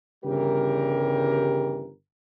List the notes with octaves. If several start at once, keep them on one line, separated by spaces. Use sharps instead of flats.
G1 C#3 E3 G3 G4 A#4